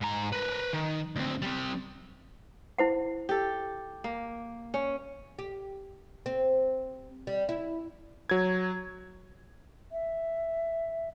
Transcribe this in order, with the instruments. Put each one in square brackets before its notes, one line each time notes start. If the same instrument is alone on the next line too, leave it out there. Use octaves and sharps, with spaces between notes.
[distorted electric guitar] G#2 A#5
A#4 B4
D#3
D2 C4
G3 C4
[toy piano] E4 C5 F#5
[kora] G4 A4
A#3
C#4
[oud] G4
C4
G3
E4
[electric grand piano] F#3 G#6
[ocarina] E5